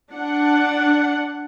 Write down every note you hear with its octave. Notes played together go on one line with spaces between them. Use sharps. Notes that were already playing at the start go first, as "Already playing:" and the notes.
D4 F#5